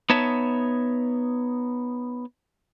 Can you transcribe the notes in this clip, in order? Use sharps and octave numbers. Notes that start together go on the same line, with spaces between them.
B3 D#4 C#5 E5 A5